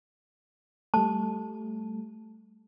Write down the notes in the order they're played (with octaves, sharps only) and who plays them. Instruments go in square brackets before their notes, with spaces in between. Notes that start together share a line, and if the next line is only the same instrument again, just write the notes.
[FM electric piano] G3 A3 [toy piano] A5